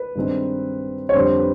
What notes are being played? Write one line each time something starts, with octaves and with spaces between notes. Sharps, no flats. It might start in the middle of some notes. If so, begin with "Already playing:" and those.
Already playing: B4
G2 D#3 G#3 C4 D#4
C#5
F2 D3 G3 C5
B4